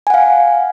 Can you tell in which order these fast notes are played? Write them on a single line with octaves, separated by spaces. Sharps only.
G#5 F#5 F5